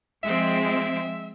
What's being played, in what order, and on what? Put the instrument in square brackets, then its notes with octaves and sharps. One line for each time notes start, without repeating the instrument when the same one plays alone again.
[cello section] F3 G#3 C4 [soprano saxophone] E5